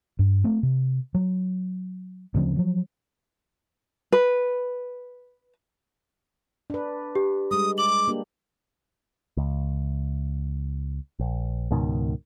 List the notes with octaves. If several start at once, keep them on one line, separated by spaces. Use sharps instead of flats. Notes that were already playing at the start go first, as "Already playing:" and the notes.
G2
A3 C4
C3
F#3
D2 C#3 F3 C4
F3 F#3
B4
D4 B4
G4
G3 G#3 D#6
D6 F#7
A#3 D4 G4
C#2
A#1
C#2 G#2 B2 D#3